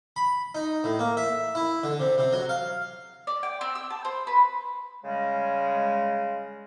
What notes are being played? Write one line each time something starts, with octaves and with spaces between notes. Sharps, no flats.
B5
D#4
A2
A#3
E5
E4
D3
C3
C3
F#3
F5
D5
G5
C4
E6
A5
C5
B4
C#3 G3 G#3